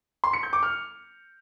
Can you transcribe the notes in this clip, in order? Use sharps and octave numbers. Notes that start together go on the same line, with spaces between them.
C6
C#7
G6
D6
F6